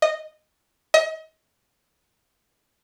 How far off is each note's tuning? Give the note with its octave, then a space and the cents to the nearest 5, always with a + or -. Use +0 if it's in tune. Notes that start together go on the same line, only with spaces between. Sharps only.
D#5 -10
D#5 +35